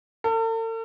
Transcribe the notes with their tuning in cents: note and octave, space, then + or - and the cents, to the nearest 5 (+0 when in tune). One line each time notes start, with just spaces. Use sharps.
A4 +45